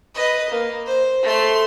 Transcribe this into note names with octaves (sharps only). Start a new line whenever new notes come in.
B4 D#5
A#3
C5
A3 C6